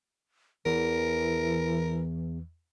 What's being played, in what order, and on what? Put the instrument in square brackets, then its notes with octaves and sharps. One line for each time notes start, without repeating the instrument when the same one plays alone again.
[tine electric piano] E2 [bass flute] E3 [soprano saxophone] A#4